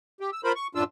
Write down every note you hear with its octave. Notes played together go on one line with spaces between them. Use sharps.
G4
E6
F4 A#4 C5 B5
C#6
F#2 A2 F3 D4 F4 E6